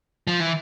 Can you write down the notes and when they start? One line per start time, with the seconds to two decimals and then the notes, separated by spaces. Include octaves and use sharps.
0.27 F3
0.40 E3